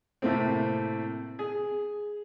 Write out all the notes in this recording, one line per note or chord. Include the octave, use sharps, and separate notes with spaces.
A2 C3 A3 A#3 C4
G#4